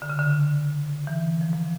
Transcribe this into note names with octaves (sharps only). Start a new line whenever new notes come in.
D3
C#3
D3
E3
F3
F3